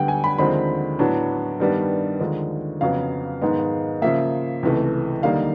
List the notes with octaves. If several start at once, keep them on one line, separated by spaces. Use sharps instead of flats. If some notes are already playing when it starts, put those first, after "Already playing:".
Already playing: D2 D3 G3 B3 F#5 G5
G#5
B5
D#2 D3 F3 G#3 C4 B5
A2 F#3 B3 D4
G2 D#3 G3 B3 D4
D#2 D3 F3 G#3
F2 C#3 F#3 B3 F5
G#2 D#3 G#3 B3
C#3 F3 A#3 E5
C#2 C3 E3 A3
D#2 D3 G3 A#3 D#4 F5